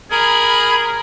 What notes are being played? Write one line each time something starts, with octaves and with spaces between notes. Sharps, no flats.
G#4 A#4 B5